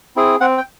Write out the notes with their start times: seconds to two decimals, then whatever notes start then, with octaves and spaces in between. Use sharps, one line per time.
0.16 C4 E4 G#4
0.40 C4 F#5
0.58 G5